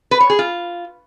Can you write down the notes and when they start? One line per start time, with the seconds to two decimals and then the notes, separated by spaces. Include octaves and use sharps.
0.11 B4
0.20 C#5
0.30 G#4
0.39 F4